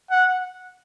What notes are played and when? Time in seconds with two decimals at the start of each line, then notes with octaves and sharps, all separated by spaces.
0.11 F#5